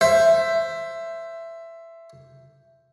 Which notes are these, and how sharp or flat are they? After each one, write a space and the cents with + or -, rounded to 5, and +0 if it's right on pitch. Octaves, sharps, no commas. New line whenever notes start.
C5 +0 E5 +15